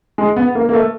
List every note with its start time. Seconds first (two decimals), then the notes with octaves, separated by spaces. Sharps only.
0.18 G#3
0.36 B3
0.55 A#3
0.69 A#3
0.73 A3